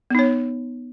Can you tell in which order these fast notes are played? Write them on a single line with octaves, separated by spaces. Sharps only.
B3 D#4 C#5